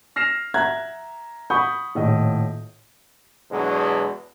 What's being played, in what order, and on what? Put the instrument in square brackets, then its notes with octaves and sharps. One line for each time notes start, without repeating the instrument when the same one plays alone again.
[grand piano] F6 A#6 C7 E7 F7
E5 F#5 A#5 F#6 G#6
F#5 B5 C#6 D#6 G6
D#1 A2 D#5
[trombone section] E2 B2 D3 E3 F#3 G#3